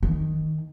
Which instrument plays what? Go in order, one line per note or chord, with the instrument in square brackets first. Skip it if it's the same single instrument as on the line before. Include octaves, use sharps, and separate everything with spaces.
[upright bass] D#3